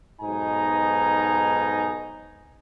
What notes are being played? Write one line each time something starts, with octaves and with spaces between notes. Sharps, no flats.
B1 G#2 B2 D#4 G#5 A#5